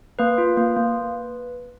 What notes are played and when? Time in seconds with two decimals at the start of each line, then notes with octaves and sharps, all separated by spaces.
0.19 A#3 B4
0.38 F4
0.57 A#3
0.77 A#3